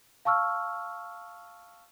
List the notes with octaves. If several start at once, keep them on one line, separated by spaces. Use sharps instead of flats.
F5 A5 C#6 E6 F6